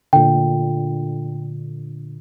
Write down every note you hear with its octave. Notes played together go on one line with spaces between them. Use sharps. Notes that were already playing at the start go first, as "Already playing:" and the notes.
A#2 D3 G5